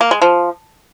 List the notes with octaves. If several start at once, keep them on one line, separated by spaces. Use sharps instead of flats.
A#3
G#3
F3